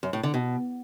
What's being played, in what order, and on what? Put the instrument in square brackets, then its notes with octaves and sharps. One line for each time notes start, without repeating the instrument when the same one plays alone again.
[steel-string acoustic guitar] F#2
A2
D3
B2